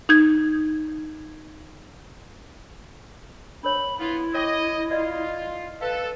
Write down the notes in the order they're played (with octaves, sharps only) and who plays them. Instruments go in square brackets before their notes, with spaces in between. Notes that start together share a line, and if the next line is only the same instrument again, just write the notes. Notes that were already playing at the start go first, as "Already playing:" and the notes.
[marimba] D#4 G6 G#6
[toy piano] D4 A#4 C#5 [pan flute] B5
[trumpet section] B3 F4 [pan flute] E4
[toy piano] C#5 G5 D6 [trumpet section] D#5
[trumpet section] F4 [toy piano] D5 D#5 F#5
[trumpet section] A4 [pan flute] B4 [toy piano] F5